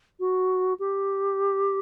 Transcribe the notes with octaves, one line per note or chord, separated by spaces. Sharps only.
F#4
G4